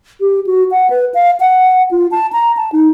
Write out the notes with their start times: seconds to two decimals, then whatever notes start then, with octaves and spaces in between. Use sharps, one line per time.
0.20 G4
0.46 F#4
0.71 F#5
0.90 B4
1.14 F5
1.40 F#5
1.91 F4
2.11 A5
2.32 A#5
2.57 A5
2.72 D#4